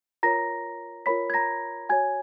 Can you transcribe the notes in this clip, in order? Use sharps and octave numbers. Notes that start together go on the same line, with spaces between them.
F4 A#4 C#5 A#5 A#6
F4 A#4 C#5 B5 B6
G#6
A#5 A#6
F#4 C#5 G#5 G#6